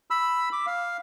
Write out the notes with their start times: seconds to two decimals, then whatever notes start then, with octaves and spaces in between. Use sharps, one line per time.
0.10 B5 E6
0.53 D6
0.66 F5